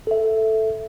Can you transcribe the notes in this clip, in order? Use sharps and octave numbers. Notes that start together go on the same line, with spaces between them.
A4 E5